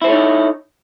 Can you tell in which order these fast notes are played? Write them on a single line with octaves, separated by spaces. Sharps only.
E4 C5 A4 C#5 D#4